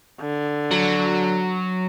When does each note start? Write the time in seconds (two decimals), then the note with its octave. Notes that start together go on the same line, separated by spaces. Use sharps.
0.21 D3
0.71 F#3